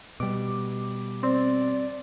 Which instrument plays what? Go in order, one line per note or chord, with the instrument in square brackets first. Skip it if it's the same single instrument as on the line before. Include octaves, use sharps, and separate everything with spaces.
[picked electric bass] B2 G3 [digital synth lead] D6
[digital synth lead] C4 [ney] D5